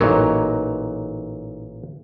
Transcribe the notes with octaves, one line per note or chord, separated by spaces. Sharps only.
A1 A#2 F#3 D#4 A#4